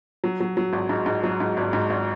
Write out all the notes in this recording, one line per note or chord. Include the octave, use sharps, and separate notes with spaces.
F#3
F#3
F#3
G#1
G#2
G#2
F#3
G#2
G#1
G#2
G#1